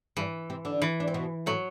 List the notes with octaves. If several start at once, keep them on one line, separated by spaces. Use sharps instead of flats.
G2 E3 G3
C3 C4
D3 D4
E3
D4
C4
B2 B3
A2 F#3 A3